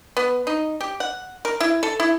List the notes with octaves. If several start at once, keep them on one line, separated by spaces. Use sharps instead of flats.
B3
D#4
G4
F#5
A#4
E4
A4
E4